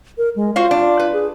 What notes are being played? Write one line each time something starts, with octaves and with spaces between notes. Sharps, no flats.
A#4
G#3
F4 F#4 C5 F5
D4
B4
G#4